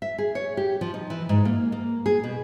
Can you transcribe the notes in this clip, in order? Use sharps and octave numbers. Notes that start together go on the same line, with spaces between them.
E5
G#4
C#5
G4
F3
D#4
E3
G#2
A#3
A#3
G#4
B2